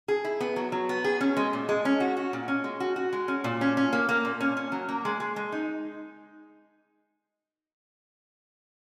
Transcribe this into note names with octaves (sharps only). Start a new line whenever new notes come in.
G#4
E4
B3
F#3
F#3
B3
G#4
C#4
G#3
A#2
G#3
C#4
F#4
F#4
A#2
C#4
G#3
F#4
F#4
G#3
C#4
A#2
C#4
C#4
A#3
A#3
A#2
C#4
C#4
F#3
A#3
G#3
G#3
G#3
D#4